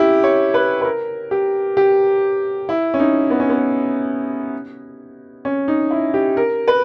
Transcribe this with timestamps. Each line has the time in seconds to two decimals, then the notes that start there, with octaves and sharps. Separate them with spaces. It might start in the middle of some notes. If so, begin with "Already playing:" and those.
Already playing: C#4 E4 G4
0.24 C#5
0.54 B4
0.81 B4
0.85 A#4
1.31 G4
1.77 G4
2.69 E4
2.94 C#4
3.00 D#4
3.30 B3
3.40 C#4
3.49 B3
5.45 C#4
5.68 D#4
5.91 E4
6.14 G4
6.37 A#4
6.68 B4